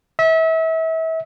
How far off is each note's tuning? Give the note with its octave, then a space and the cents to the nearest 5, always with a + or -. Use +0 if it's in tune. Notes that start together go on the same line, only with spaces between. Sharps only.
E5 -35